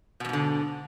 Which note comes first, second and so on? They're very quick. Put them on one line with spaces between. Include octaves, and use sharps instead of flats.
B2 F2 G#2 D3